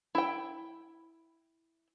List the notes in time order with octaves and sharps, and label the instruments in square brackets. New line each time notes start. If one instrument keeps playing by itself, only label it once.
[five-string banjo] E4 G5